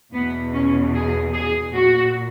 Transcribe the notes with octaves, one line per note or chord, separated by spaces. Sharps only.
E2 B2 B3
C#4
G#4
G#4
A#2 F#4